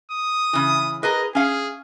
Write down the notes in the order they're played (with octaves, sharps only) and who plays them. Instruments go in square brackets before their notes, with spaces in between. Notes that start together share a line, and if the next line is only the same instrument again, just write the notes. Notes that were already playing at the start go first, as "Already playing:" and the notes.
[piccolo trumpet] D#6
[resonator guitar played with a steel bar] C#3 E3
[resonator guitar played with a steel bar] G#4 A#4 B4 [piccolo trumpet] D#5
[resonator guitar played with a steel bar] C#4 F5 [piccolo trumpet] G#4